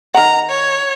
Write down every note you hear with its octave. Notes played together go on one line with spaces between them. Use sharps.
D#3 F#5 A#5
C#5